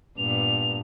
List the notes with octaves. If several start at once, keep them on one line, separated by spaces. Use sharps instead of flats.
G2 A#2 B3 F7